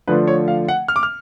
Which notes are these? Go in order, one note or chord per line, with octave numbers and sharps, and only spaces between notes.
D3 F3 A3 D4 F4 B4
C#5
F5
F#5
F6
D6
F6